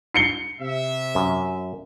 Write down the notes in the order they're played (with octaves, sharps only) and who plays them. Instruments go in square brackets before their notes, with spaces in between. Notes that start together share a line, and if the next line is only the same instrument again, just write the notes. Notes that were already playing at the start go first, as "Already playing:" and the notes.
[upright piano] C7 C#7 G7
[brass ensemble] C3 E5
[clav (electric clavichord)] F#2